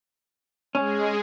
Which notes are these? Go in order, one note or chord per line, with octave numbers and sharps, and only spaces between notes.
G#3 C#4 G#4